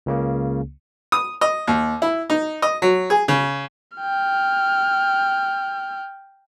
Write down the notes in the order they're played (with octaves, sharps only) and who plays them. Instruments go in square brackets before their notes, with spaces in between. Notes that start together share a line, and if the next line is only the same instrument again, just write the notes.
[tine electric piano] C#2 C#3 A#3
[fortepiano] D#6
D#5
D#2
E4
D#4
D#5
F#3
G#4
C#3
[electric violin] G5 F6